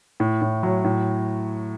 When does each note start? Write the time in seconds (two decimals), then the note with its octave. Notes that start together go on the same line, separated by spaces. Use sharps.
0.20 A2
0.42 A2
0.63 F#3
0.84 A2